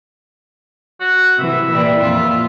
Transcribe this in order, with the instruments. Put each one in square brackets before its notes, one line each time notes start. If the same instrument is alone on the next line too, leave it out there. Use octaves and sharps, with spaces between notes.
[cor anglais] F#4
[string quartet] C3 E3 [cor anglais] E5
[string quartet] A#2 E3 G3
F2 A#2 F4